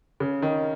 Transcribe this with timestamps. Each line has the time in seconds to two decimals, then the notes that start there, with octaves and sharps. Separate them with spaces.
0.20 C#3
0.42 D#3